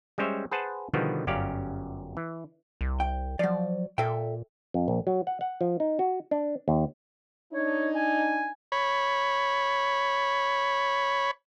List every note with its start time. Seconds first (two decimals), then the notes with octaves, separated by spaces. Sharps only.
0.18 G3 G#3 C#4 C5 C#5 E5
0.51 G#4 B4 C5 F#5 A5
0.94 B2 D3 D#3 F3 G3 B3
1.27 G1 F#2 C#4 G4 D5 F5
2.17 E3
2.81 C2
3.00 G5
3.39 F3 F#3 D5
3.98 A#2 A4 E5 G5
4.74 F2
4.88 A#1
5.07 F#3
5.27 F#5
5.41 F#5
5.61 F3
5.80 D#4
5.99 F#4
6.31 D4
6.68 D#2
7.53 D4 D#4 C#5
7.95 G#5
8.72 C#5 B5